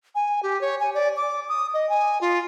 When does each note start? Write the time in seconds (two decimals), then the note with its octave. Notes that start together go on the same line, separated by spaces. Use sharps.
0.15 G#5
0.43 G4
0.61 C#5
0.80 G#5
0.95 D5
1.17 D6
1.49 D#6
1.74 D#5
1.89 G#5
2.21 F4